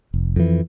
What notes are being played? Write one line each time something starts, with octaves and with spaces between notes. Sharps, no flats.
F1
F2 E3